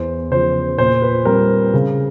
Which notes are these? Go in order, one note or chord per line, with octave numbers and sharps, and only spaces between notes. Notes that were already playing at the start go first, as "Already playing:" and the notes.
Already playing: E2 C5
C#3 F3 C5
A#2 C5
B4
G3 C4 A#4
C#3